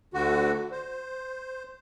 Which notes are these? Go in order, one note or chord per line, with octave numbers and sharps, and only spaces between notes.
D2 D3 F#4
C5